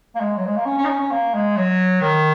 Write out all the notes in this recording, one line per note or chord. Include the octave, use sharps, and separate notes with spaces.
A#3
G#3
F#3
G#3
A#3
C#4
C#4
D#4
C#4
C#4
A#3
G#3
F#3
D#3